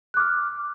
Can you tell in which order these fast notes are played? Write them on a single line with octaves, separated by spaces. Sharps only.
F#6 D6 F6